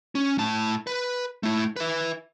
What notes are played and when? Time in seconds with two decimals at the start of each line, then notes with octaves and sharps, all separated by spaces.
0.15 C#4
0.38 A2 A5
0.87 B4
1.43 A3 E4
1.76 B4 E5